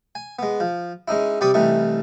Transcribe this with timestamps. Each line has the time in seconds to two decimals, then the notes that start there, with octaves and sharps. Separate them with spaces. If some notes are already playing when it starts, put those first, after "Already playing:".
0.15 G#5
0.39 G#3 B3
0.60 F3
1.08 G#3 C#4 D#4 E4
1.41 C3 G3 D5 B5 C#6 D#6
1.54 C2 E3 G3 A3 D#4 C#6